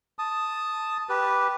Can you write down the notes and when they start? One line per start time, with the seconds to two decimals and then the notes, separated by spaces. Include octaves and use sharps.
0.19 A5 D#6
1.09 G4 B4